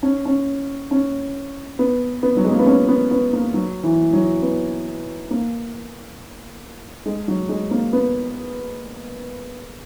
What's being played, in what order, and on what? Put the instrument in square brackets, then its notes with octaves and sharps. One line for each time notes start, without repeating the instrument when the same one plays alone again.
[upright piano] C#4
C#4
C#4
B3
B3
F#3
G#3
A#3
B3
C#4
B3
B3
A#3
F#3
E3
F#3
B3
A#3
G#3
F#3
G#3
A#3
B3